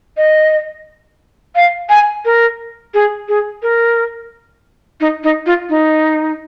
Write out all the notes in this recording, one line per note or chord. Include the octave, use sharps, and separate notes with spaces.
D#5
F5
G#5
A#4
G#4
G#4
A#4
D#4
D#4
F4
D#4